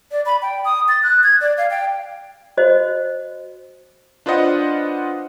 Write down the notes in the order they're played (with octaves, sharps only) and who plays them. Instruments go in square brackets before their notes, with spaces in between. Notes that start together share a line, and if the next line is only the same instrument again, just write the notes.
[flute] D5
B5
G5
D#6
A6
F#6
G#6
D5
F5
G5
[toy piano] F#4 C5 D#5
[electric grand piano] D4 F4 B4 C5 D#5 F#5